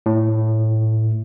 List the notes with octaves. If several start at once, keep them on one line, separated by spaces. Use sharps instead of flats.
A2